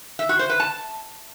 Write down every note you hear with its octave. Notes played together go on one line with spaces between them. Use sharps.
E5
F#4
C5
B4
A5